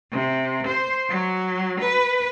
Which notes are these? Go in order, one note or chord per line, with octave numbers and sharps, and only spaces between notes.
C3
C5
F#3
B4